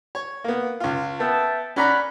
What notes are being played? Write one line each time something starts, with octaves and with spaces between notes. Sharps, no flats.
C#5
A#3 B3
C#2 F4
B3 E5 G5 A5
C#4 D5 F#5 A#5 B5